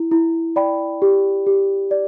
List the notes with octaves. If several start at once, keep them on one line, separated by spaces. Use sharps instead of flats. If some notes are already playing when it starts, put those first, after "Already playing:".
Already playing: E4
E4
D5 G5 B5
G4
G4
D5